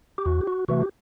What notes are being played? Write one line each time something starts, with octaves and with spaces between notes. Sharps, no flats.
G4
E2 F#4
G4
F#4
C3 E3 A3 F#4
G4